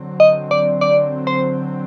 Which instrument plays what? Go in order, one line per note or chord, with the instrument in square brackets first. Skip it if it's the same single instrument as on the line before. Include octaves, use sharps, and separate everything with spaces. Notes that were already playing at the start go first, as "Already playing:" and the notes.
Already playing: [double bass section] D3 F#3 C4
[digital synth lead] D#5
D5
D5
C5